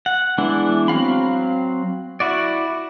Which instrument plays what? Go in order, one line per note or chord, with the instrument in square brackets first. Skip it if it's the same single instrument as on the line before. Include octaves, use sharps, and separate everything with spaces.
[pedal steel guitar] F#5
E3 G#3 B3 D4 E4
F#3 C4 F5 B5
E4 F#4 D5